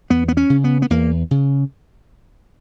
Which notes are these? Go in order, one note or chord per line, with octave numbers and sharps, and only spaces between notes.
E2 B3
B3
C#4
C#3
B3
B3
E2 A#3
C#3